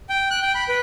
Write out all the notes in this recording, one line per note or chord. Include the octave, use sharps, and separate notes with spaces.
G5
F#6
G5
B5
B4